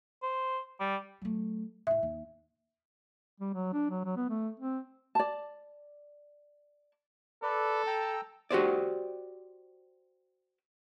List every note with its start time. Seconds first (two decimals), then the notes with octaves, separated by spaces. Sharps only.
0.23 C5
0.80 G3
1.22 F#3 A3
1.87 A2 E4 E5
2.03 D#2
3.40 G3
3.54 F#3
3.73 D4
3.90 F#3
4.05 F#3
4.16 B3
4.29 A3
4.59 C4
5.15 D5 A5
7.43 A4 B4 D5
7.87 G5 A#5 E6
8.51 F#4 G4 C5 D5